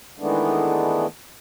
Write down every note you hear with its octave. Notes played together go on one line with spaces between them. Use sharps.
D#3 E3 G#3 A3 B3 D4